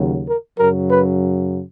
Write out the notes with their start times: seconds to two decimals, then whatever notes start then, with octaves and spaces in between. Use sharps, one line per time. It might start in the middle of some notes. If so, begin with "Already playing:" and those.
Already playing: D#2 C#3 F#3
0.26 A#4
0.58 F#2 C#3 F#3 A#4
0.91 B4